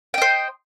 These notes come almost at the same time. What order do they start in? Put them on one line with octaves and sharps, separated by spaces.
G5 D#5 C5